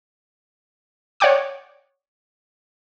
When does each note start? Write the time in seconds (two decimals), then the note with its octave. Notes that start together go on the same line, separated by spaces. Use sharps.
1.20 C#5 D5 F#5 G5 D6 D#6